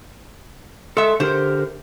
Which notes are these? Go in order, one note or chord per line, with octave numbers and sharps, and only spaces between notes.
G#3 A4 E5
D3 G4 A#4 C5